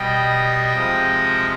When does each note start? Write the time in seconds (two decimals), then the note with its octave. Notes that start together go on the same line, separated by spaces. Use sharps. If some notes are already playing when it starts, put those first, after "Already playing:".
Already playing: B2 G3 D#5 G5
0.72 C3 F3 G#3